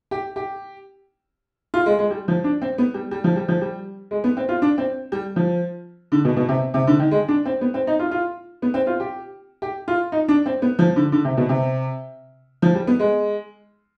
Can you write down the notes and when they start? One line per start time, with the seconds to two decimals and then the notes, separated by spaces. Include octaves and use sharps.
0.11 G4
0.36 G4
1.74 F4
1.86 G#3
1.99 G#3
2.11 G3
2.28 F3
2.44 D4
2.62 C4
2.78 B3
2.94 G3
3.11 G3
3.24 F3
3.36 G3
3.48 F3
3.61 G3
4.11 G#3
4.24 B3
4.37 C4
4.49 F4
4.62 D4
4.78 C4
5.12 G3
5.36 F3
6.12 D3
6.25 B2
6.37 B2
6.49 C3
6.74 C3
6.87 D3
6.99 D#3
7.11 G#3
7.28 D4
7.46 C4
7.61 B3
7.74 C4
7.87 D#4
7.99 F4
8.11 F4
8.62 B3
8.74 C4
8.87 F4
9.00 G4
9.62 G4
9.88 F4
10.12 D#4
10.29 D4
10.46 C4
10.62 B3
10.79 F3
10.96 D3
11.12 D3
11.25 C3
11.37 B2
11.49 C3
12.62 F3
12.75 G3
12.87 B3
13.00 G#3